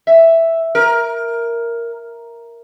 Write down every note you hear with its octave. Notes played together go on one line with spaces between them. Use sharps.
E5
A#4